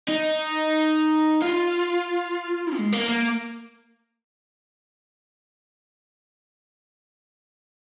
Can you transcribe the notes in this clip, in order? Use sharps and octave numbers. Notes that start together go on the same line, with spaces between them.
D#4
F4
G#3
A#3
A#3